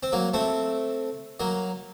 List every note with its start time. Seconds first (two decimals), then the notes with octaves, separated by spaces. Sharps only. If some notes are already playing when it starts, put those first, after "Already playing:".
0.03 C4
0.12 F#3 A#3
0.34 A3 C4
1.40 F#3 A#3